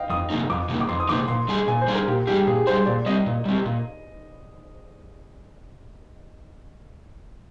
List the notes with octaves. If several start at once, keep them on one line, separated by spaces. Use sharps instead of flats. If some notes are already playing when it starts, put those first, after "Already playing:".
Already playing: D#5 F5 G5
F2 D#6
C3 F3 A#3 D#4
F2 D6
C3 F3 A#3 D#4
D6
F2 C6
D#6
C3 F3 A#3 D#4 D6
A#2 C6
G3 D4 G#4
A#2 G#5
C5
G3 D4 G#4
A#4
A#2 G4
G3 D4 G4 G#4
A#2 G#4
G3 D4 G#4 C5
A#2 D5
G3 C4 G4 D#5
A#2
G3 C4 G4
A#2